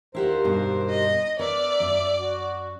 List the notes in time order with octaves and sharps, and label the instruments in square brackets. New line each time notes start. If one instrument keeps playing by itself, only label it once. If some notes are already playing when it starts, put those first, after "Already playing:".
[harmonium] D#2 A#4 C5 [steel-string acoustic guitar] E4 G4 F#5
[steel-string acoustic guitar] G2 B2
[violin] D#5
[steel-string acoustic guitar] B3 A#4 [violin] D5 [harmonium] E5
[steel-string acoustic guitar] F#2
[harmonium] F#4